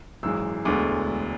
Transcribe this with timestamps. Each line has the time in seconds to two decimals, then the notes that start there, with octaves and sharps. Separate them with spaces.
0.23 G#1 F#2 E3 G#3 E6
0.65 E1 D2 D3 G#3 B3 D6